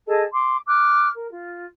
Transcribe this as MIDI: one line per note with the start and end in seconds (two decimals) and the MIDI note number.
0.07 0.22 68
0.07 0.22 69
0.07 0.22 75
0.07 0.22 81
0.33 0.57 84
0.33 0.57 86
0.67 1.07 86
0.67 1.07 89
0.67 1.07 90
1.13 1.30 70
1.30 1.64 65